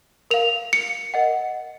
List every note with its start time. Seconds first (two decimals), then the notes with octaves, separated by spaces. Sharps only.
0.31 A#4 F5 F7
0.73 C#7
1.14 A#4 D#5 F#5